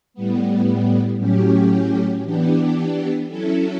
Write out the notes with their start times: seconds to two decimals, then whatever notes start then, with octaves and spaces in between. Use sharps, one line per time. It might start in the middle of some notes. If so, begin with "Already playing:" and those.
0.14 A2 G3 B3
1.18 A2 F#3 C#4 G4
2.23 E3 B3 D4 G4
3.27 F#3 C#4 E4 A4